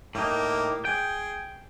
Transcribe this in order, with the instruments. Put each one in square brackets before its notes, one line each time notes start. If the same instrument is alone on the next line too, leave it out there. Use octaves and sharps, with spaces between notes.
[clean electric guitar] A2 D#4 [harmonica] A#3 G4
[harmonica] G#4 [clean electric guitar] G5